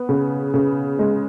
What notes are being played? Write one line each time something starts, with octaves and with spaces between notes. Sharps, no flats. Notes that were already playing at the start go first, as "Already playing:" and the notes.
Already playing: B3
C#3
C#3
G#3